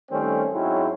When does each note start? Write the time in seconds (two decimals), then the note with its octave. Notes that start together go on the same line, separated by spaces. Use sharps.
0.10 D#3 G3 A3 C4 C#4
0.53 G#2 F#3 G#3 C4 C#4 E4